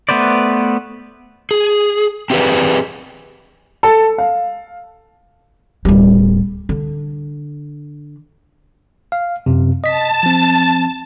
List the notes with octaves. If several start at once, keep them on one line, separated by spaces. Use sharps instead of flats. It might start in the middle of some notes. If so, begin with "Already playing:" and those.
A3 B3 B4 C5 D5
G#4
C4 G4 G#4 B4 D5
A4
F5
D1 G3
D3
F5
F#2 C3
D#5 A5 B6
F3 C4